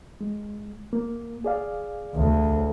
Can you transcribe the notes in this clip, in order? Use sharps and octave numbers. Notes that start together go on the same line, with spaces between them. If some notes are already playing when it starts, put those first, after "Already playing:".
G#3
A#3
G#4 D5 F5
D2